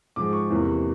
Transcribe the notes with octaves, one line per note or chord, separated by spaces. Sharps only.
G#2 F3 G#3 D6
C#6
E2 C3 E3 G3 A#3